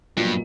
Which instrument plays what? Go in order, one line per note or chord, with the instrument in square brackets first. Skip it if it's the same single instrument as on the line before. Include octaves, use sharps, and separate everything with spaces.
[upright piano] B1 A#2 F3 A#3 [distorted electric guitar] G2